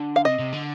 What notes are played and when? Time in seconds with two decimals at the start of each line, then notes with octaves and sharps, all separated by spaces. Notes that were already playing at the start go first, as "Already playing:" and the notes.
Already playing: D3
0.16 F5
0.25 C3 D#5
0.39 C3
0.53 D3